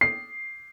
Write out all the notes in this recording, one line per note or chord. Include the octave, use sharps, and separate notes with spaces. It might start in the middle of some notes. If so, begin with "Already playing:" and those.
C7